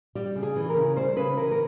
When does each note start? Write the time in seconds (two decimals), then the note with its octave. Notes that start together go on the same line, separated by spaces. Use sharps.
0.15 G3 G4
0.36 C#3
0.43 G#4
0.56 E3
0.69 A#4
0.76 C#3
0.96 G3 C5
1.16 C#3 B4
1.37 E3 A#4
1.51 A#4